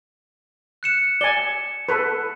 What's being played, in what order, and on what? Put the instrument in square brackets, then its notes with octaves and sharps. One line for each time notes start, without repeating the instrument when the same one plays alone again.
[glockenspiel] F#6 C#7 E7
[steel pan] D5 G#5 [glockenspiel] G7
[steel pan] A4 B4